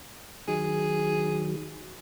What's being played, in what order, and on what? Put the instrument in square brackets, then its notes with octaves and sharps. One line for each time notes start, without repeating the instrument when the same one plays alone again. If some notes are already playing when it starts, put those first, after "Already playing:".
[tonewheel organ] D#3 F#3 [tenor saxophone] G#4